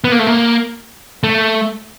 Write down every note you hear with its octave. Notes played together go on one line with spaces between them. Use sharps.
B3
A#3
A3
A#3
A3